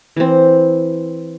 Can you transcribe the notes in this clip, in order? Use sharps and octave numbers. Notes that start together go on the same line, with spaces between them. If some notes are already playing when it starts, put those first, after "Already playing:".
E3 C4